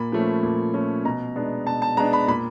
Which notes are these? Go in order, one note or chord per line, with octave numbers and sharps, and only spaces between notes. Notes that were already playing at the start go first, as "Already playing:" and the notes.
Already playing: A#2 B5
F3 A3 C#4
A#2
F3 A3 C#4
B2 A#5
G#3 B3 D4
B2 A5
A5
G#3 B3 D4 A#5
B5
A#2 B5